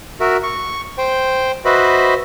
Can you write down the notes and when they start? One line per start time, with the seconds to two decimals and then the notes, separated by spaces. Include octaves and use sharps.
0.20 F#4 A#4 E5
0.43 C#6
0.98 C5 G5
1.65 F#4 B4 C5 D#5 E5 B5